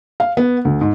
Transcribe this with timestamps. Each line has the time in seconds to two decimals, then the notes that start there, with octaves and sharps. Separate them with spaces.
0.20 F5
0.37 B3
0.65 D2
0.81 G#2